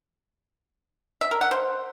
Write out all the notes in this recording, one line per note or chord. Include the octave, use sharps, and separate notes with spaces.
E5
A#4
F#5
C5